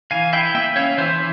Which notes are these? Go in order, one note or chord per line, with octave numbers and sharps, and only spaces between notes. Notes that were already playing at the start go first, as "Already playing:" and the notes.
E3 F5 G#5
E4 E5 G5
A#3 E5 G5
C#4 C#5 F5
E3 C5 E5